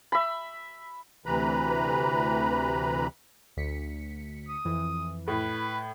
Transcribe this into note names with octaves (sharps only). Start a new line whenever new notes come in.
E5 B5
D2 C3 E3 B4 A#5 B5
D2 B6 C#7
D#6
F2 E3
A2 B4